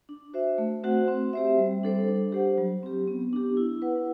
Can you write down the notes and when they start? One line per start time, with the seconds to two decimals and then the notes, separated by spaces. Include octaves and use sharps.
0.09 D4
0.34 F#4 C5 E5
0.58 A3
0.83 C4 F#4 C5 F#5
1.08 C4
1.33 G4 C5 E5
1.58 G3
1.83 D4 A4 C5
2.08 D4
2.32 G4 C5 F#5
2.58 F#3
2.83 C4 G4
3.08 B3
3.33 D4 G4
3.57 E4
3.82 B4 F#5